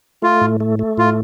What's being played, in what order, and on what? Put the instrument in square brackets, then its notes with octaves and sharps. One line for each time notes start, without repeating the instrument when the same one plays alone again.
[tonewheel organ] A3 [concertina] F4
[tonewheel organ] A2
A3
A3
[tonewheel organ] A2 [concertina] F4